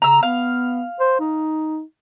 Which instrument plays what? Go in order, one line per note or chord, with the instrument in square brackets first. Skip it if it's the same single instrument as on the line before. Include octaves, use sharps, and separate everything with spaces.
[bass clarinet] C#3 [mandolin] A#5 E6
[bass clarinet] B3 [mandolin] F5
[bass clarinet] C5
D#4